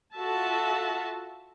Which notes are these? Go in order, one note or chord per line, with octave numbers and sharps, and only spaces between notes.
F4 F#4 A4 E5 A5